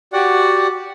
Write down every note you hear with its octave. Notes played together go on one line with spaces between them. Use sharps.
F#4 G4 D5 F#5